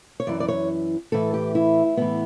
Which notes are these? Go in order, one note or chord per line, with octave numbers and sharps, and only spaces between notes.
C#5
F#2 E3 D5
D5
C#5
A2 E3 A4
G4
E4
A2 E3 B3